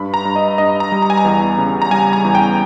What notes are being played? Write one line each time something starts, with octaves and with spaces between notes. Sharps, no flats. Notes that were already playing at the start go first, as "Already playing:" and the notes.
Already playing: G2 B5
A#5
G2
D#5
G2 D#5
A#5
G3
A#5
G#5
A#5
E2
C#3
A#5
G3 G#5
A#5
E2
G5